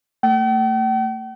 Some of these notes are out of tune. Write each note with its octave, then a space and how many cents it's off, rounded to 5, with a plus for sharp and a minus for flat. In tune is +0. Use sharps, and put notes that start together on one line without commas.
A3 +35 G5 -45